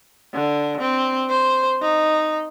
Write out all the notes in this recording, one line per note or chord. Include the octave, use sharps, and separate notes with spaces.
D3
C4
C5
D#4